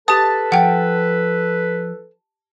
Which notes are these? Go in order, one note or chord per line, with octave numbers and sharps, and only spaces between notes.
G4 A4 B4 A5 D#6
F3 F#5 G5